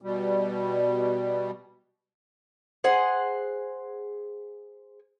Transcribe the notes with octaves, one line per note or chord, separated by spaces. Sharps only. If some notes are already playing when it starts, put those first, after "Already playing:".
B2 G3
G#4 C5 F#5